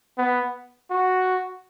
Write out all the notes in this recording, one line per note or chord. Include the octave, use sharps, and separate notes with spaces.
B3
F#4